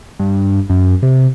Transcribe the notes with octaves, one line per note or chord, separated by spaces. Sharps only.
G2
F#2
C3